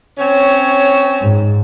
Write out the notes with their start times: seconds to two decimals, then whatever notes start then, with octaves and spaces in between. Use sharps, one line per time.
0.18 C4 C#4 C#5
1.23 G#2